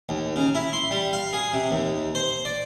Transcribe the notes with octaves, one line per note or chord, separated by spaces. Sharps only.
D#2
C#3
E4
C6
G3
F5
G#4
C3
D#2
C5
D5